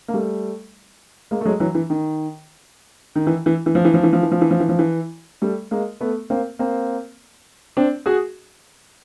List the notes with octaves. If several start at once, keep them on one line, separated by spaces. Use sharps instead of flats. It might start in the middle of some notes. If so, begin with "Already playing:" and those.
A#3
G3 A3
G#3 A#3
A3
F#3 G#3
E3 F#3
E3
D#3
D#3
E3
E3
E3
F3
E3
F3
E3
F3
E3
F3
E3
F3
E3
F3
E3
G3 A3
G#3 A#3
A3 B3
A#3 C4
A#3 C4
C4 D4
F#4 G#4